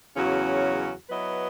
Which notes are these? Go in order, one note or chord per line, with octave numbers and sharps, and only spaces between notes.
E2 C#3 F#3 C#4 F#4
F#3 B3 E4 B4 D#5